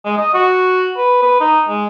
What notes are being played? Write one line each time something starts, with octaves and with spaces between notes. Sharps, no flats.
G#3
D#5
F#4
B4
B4
D#4
G#3